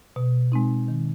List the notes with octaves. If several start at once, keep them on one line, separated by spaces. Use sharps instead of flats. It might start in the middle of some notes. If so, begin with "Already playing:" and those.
B2
G#3 C4 D#4
D#3